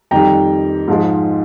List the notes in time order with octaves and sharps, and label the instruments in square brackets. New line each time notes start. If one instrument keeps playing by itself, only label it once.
[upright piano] F2 D#3 G3 G5 A#5
G#2 F3 G#3